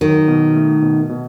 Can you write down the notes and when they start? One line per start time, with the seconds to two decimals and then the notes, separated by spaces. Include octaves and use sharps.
0.01 D#3 F#3
0.28 B2
0.56 A3
0.82 B2
1.09 B2